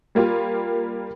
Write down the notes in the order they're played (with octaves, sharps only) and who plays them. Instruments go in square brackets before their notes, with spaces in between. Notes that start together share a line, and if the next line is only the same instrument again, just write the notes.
[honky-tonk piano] G3 A#3 F4 G4